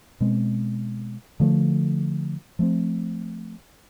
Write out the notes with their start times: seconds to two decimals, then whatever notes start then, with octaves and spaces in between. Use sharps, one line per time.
0.21 B2 G#3 C4
1.40 D3 F3 A3
2.59 F3 A3 C4